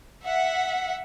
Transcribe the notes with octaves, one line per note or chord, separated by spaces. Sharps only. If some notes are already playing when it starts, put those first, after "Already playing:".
E5 F#5